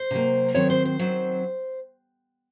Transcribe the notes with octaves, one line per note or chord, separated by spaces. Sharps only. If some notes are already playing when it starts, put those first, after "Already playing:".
Already playing: C5
C3 F#3 A#3
D#3 F#3 C4 C#5
C5
C5
D#3 F#3 C4